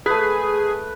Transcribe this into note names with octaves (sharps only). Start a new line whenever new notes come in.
A3 G#4 B4